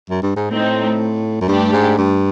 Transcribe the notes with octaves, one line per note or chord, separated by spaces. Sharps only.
F#2
G2
G#2
A2 A3 C4 D#4
F#2
G2 A3 D4 G4
G#2
G2